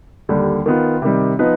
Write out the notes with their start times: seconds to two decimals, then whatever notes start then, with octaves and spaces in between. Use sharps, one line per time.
0.29 D#2 D3 G3
0.66 D#3 B3 F4
1.02 C3 D#3 G3
1.39 F3 B3 D#4 B4